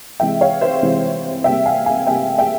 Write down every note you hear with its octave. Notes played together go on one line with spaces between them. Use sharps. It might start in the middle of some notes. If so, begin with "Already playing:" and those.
C3 E3 G#3 E5 G5
C#5 F5
C5 E5
C3 E3 G#3
C3 G3 A#3 E5 G5
F5 G#5
F5 G#5
C3 G3 A#3 E5 G5
E5 G5